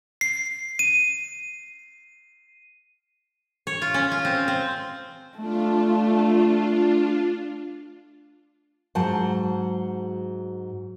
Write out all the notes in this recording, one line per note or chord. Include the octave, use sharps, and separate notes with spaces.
C7
D#7
C#5
F4
C#4
F4
C4
C4
A3 D4 F4
G#2 F#3 C5 F#5 A5